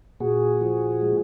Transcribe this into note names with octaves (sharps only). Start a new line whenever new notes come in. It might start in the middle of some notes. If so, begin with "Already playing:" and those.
A#2 F#4 G#4
F3
G#3